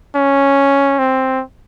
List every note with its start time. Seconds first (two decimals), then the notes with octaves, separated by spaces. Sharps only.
0.16 C#4
0.99 C4